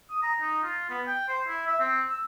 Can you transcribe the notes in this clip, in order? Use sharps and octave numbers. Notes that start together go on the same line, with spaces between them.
D#6
A#5
D#4
F4
B3
G5
C5
E4
E5
C4
E6